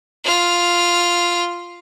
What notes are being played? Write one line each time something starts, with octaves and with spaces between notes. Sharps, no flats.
F4 F6